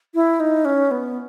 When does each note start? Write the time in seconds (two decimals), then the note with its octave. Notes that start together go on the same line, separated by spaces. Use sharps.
0.14 E4
0.40 D#4
0.65 C#4
0.91 B3